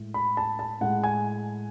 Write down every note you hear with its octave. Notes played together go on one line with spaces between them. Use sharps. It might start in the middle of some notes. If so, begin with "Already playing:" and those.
Already playing: A2 G#3
B5
A5
A5
A2 G#3 F#5
G#5